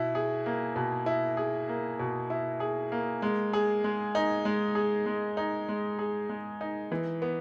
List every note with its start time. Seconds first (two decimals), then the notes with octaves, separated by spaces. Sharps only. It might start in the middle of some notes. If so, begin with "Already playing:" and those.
Already playing: B2 E4
0.15 G#4
0.46 A#3
0.76 B2
1.06 E4
1.37 G#4
1.69 A#3
1.99 B2
2.30 E4
2.60 G#4
2.92 A#3
3.22 G#3
3.53 G#4
3.84 G#3
4.15 D#4
4.45 G#3
4.75 G#4
5.06 G#3
5.37 D#4
5.69 G#3
5.99 G#4
6.29 G#3
6.61 D#4
6.92 E3
7.22 B3